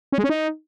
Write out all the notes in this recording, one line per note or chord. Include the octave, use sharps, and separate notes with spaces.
C#4
G#3
C#4
D#4